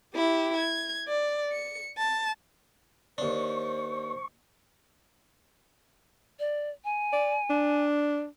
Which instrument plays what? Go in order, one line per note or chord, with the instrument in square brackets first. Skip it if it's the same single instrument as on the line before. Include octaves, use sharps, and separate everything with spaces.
[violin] E4 G4
G#6
D5
C#7
A5
[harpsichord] D#2 D4 [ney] C5 [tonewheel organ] C#6
[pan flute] D5
G#5
[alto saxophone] D5
D4